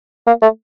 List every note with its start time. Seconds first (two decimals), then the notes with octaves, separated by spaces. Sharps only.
0.27 A#3
0.42 A3